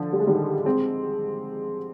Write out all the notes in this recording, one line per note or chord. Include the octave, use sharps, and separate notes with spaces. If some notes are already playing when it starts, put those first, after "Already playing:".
Already playing: D3 F3
G3
G#3
D#3 G3
G#3 C4